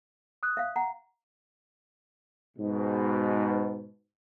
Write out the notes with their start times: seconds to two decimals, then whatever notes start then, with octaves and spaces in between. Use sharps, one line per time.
0.43 D#6 F#6
0.57 E5 F5
0.76 F#5 A#5
2.57 G#2 B2